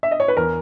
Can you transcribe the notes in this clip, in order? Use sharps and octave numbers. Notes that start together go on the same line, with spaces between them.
E5
D#5
C#5
B4
E2 A#4